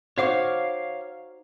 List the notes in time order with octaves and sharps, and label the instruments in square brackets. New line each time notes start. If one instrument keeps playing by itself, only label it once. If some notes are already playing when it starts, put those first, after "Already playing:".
[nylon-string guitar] D#4 F#4 C5 [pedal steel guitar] C#5 F5 D6